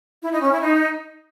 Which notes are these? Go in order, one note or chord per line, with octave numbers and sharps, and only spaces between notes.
E4
D#4
C#4
E4
D#4